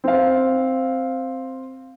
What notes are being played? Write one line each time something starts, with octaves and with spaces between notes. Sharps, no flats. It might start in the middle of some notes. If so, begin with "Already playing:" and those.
C4 F5